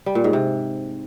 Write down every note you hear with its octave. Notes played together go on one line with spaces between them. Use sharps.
G3
A#2
G#2
C3